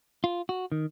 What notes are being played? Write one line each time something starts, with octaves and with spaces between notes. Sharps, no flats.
F4
F#4
D#3